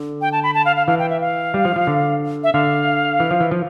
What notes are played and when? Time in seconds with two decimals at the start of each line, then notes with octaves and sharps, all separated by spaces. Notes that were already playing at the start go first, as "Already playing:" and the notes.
Already playing: D3
0.21 G5
0.32 A5
0.43 B5
0.54 A5
0.65 F5
0.76 F5
0.87 E3 F5
0.99 G5
1.09 E5
1.21 F5
1.54 G3
1.65 F3
1.76 F3
1.87 D3
2.44 E5
2.53 D3 F5
3.20 E3
3.31 F3
3.40 E3
3.51 F3